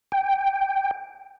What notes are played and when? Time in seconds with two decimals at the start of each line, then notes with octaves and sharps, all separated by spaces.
0.12 G5